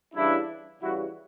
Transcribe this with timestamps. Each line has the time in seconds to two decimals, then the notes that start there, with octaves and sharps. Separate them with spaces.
0.15 C#3 E3 G3 D4 E4
0.81 C#3 E3 G3 E4 F#4